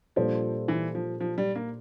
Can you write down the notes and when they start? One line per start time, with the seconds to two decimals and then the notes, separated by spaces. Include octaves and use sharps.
0.16 A#2 F3 G3 D4 A4 C5
0.68 E3
0.95 F3
1.20 F3
1.38 G3
1.56 A#3